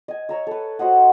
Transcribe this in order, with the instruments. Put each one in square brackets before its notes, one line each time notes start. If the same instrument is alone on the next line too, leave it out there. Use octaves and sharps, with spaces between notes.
[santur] D#5 G#5
C#5 A#5 E6
A4 B4
F#4 C5 D#5 F#5